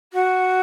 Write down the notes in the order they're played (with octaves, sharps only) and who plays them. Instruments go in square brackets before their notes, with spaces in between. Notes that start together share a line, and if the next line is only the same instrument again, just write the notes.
[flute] F#4